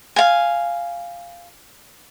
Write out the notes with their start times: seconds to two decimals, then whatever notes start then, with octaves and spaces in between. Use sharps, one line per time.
0.16 F5 G#5